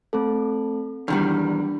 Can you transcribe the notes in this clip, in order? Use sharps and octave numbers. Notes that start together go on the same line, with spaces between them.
A3 C4 A4
E2 D#3 G3 D4